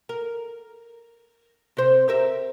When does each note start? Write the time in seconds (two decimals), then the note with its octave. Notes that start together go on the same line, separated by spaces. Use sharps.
0.09 A#4
1.77 C3 C5
2.08 G4 A#4 E5